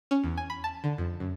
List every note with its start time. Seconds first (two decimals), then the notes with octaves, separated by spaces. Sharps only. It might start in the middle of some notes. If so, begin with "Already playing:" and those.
0.11 C#4
0.24 E2
0.37 G#5
0.50 B5
0.64 A5
0.84 D3
0.98 F2
1.20 F#2